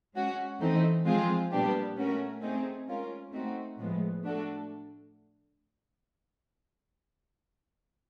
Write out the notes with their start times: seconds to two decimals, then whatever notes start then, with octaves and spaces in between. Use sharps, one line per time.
0.15 G#3 C#4 F#4
0.60 E3 A3 C4 D#4
1.06 F3 G#3 C4 F4 G#4
1.51 A#2 G3 B3 D4 G4
1.97 A3 C#4 F#4 A#4
2.42 A3 C4 D#4 G#4
2.88 G#3 C#4 F4 A#4
3.32 A3 C4 D#4 F#4
3.78 A2 F3 G#3 B3
4.23 A3 D4 F#4 A4